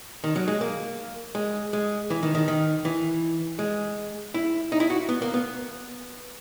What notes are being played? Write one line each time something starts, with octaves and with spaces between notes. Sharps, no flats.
D#3
F#3
G#3
A#3
G#3
G#3
E3
D#3
D#3
D#3
E3
G#3
E4
D#4
E4
F#4
B3
A#3
B3